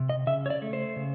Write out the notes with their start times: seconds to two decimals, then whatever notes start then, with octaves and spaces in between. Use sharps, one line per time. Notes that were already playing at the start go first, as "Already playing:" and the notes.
Already playing: C3
0.09 D#5
0.27 C#3 E5
0.46 C#5
0.50 D5
0.62 A3
0.73 C5
0.96 C#3